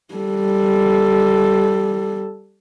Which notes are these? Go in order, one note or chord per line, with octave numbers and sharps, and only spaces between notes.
G3 A4